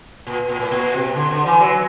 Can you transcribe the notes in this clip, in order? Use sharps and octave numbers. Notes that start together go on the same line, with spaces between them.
A#2
A#2
A2
A#2
C3
D3
D3
E3
F#3